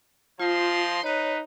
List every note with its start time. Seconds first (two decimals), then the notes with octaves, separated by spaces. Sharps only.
0.40 F3 F4 C5 D#5 C6
1.04 D#4 B4 C#5